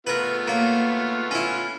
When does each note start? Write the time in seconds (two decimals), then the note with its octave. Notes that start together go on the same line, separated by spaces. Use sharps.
0.07 A3 B3 F4 A#4 B4
0.47 A#3 C#5
1.31 C#4 E4